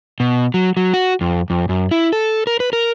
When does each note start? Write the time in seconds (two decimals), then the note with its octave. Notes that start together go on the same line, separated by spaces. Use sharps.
0.20 B2
0.54 F#3
0.77 F#3
0.94 F#4
1.21 F2
1.50 F2
1.69 F#2
1.91 E4
2.13 A4
2.47 A#4
2.60 B4
2.73 A#4